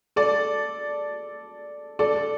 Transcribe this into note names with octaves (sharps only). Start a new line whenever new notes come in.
A4 D5
A4 D5